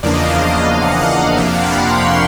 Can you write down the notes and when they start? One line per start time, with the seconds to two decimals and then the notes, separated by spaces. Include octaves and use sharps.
0.03 E2 C#3 F3 A#3 D4 D5
0.14 D#5
0.26 F5
0.36 F5
0.82 F#5
0.92 F5
1.03 D#5
1.37 F2 C3 F3 A#3 D4 E5
1.46 F5
1.54 F#5
1.63 G5
1.71 B5
1.87 C6
2.05 C#6